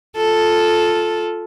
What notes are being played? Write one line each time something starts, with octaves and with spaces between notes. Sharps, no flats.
F4 A4